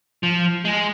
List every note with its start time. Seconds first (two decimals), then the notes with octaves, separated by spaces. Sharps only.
0.23 F3
0.65 G#3